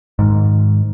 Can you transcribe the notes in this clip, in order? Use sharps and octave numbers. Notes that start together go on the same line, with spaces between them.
G#2 D#3